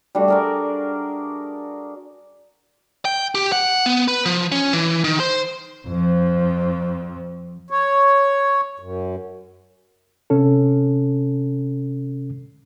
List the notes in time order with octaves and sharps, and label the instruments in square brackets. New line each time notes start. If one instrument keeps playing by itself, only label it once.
[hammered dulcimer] G3 A3 D4 F#4
G#4 A#4 D5
[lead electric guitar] G5
G4
F#5
B3
B4
F3
C#4
E3
D#3
C5
[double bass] F2 F3
[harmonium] C#5
F#2
[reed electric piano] C3 C#4 A4